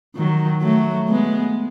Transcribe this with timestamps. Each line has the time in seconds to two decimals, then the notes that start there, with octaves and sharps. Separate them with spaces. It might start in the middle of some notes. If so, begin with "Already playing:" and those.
0.16 D#3 F#3
0.62 F#3 A3
1.08 G#3 B3